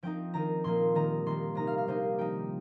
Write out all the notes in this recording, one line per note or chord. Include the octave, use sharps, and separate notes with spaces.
F3 C4 D#4 G5
D#3 C4 D#4 A#5
A#2 F3 A#3 D#4 C6
D#3 G3 D#4 A#5
D#3 G3 A#3 C6
C3 G3 A#3 D#4 A#5
F5
F5
C3 G3 A#3 D#4 C5
F3 D#4 G5